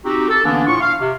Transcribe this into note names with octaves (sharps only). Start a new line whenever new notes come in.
C4 D#4 F#4 G4
A4
D3 E3 A#3 B3 C#4 D4
A2 F4 C#6
F5
C3